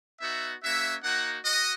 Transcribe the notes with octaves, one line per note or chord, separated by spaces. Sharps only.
B3 D#4 F#4 E5
A#3 C#4 F#4 E5
A#3 D#4 F#4 F#5
F#4 D#5